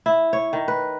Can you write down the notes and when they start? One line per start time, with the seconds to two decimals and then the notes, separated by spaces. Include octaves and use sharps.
0.06 E4
0.33 C#5
0.53 D#3
0.68 B4